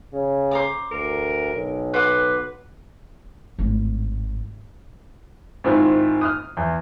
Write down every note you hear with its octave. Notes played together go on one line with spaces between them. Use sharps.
C#3
C5 A#5 D6
D2 A#4
B1
B4 C5 F#5 D6
G#1 A2
G#2 D#3 C4 E4 F4
D#6 F6
E2